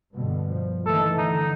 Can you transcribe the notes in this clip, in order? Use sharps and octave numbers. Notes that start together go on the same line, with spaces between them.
G2 B2 D3
F3
D#3 E3 A3 A4
D3 D#4